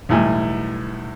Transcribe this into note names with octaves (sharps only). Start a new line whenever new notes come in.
B1 E2 A2 G3 G#5